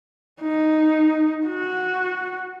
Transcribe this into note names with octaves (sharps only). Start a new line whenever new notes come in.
D#4
F#4